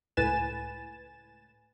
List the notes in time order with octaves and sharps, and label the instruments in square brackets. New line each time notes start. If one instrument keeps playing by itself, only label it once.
[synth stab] C#2 A2 B4 G#5 A6 E7